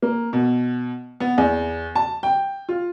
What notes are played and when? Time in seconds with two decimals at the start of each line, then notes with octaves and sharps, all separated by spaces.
0.02 A#3
0.33 B2
1.20 B3
1.38 E2
1.95 A5
2.23 G5
2.69 F4